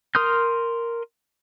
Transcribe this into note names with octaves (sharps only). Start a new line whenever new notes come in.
A#4 C6 D#6 F6 G6